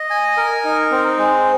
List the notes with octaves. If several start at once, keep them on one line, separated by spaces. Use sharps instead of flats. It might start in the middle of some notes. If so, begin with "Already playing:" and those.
Already playing: D#5
G#5
A#4
D#4
C4
G#3